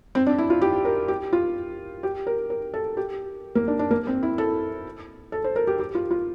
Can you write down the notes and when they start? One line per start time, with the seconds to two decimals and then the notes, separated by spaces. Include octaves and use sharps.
0.15 C4
0.27 D4
0.38 E4
0.50 F4
0.61 G4
0.85 A#4
1.08 G4
1.33 F4
2.03 G4
2.27 A#4
2.50 A#4
2.74 A4
2.97 G4
3.55 A#3
3.68 D4
3.79 D4
3.91 A#3
4.07 C4
4.23 E4
4.38 A4
5.32 A4
5.44 C5
5.56 A#4
5.67 G4
5.79 G4
5.95 F4
6.11 F4